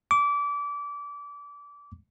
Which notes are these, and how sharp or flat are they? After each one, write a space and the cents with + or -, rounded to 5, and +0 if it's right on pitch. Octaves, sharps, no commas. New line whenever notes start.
D6 -25